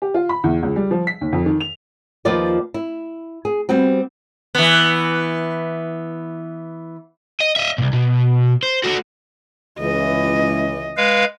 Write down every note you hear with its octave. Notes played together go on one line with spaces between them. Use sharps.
G4
F4
B5
E2
C#2
G3
F3
B6
D#2
F2
D#3
F7
D#2 F3 F4 B4 D5 D#5
E4
G#4
G3 B3 C4 F#4
E3 B3
D#5
D#5 E5
C2 A#2
B2
C5
A3 F#4
C#2 E3 D#5
G#3 B4 F5